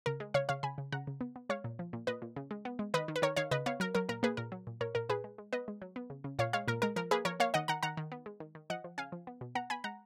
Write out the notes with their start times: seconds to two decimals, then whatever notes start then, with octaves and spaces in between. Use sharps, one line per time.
0.06 C#3 A#4
0.20 G#3
0.34 C#3 C#5 F5
0.49 C#3 C#5 F5
0.63 C#3 G#5 B5
0.78 C#3
0.92 C#3 F#5 A#5
1.07 C#3
1.21 B3
1.36 B3
1.49 G#3 C#5 F5
1.64 A#2
1.79 F3
1.93 A#2
2.07 A#2 B4 D#5
2.22 A#2
2.36 C#3
2.51 G#3
2.65 B3
2.79 G#3
2.94 D#3 B4 D#5
3.08 D#3
3.16 B4
3.22 D#3 A#4 C#5
3.37 D#3 C#5 F5
3.51 C#3 B4 D#5
3.66 B3 C#5 F5
3.80 F#3 A#4
3.95 F#3 A#4
4.09 A#2 A#4
4.23 A#3 G#4 B4
4.37 A#2 A#4
4.52 F#3
4.67 A#2
4.81 A#2 A#4 C#5
4.95 A#2 A#4
5.09 A#2 G#4 B4
5.24 G#3
5.38 G#3
5.53 B3 B4 D#5
5.68 G#3
5.82 F#3
5.96 B3
6.10 C#3
6.24 C#3
6.39 A#2 C#5 F5
6.53 G#3 C#5 F5
6.68 A#2 A#4
6.82 G#3 A#4
6.96 F3 A#4
7.11 A#3 G#4 B4
7.25 F3 A#4 C#5
7.40 A#3 C#5 F5
7.54 D#3 D#5 F#5
7.68 D#3 F#5 A#5
7.83 D#3 F#5 A#5
7.97 D#3
8.12 B3
8.26 G#3
8.40 D#3
8.55 D#3
8.70 F3 D#5 F#5
8.84 F3
8.98 C#3 F5 G#5
9.12 F3
9.27 B3
9.41 B2
9.55 B3 F#5 A#5
9.70 B3 G#5 B5
9.84 G#3 F#5 A#5